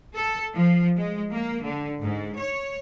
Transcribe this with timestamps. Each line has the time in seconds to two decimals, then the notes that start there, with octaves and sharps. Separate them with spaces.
0.16 A4
0.54 F3
0.97 G#3
1.32 A#3
1.63 D3
2.01 G#2
2.38 C#5